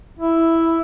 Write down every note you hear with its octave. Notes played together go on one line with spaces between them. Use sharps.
E4